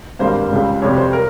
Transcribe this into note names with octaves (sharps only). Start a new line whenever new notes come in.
G#1 G2 G3 A#3 C5
C#2 C#3 G3
F2 C3 G3 C#5
C5
A#4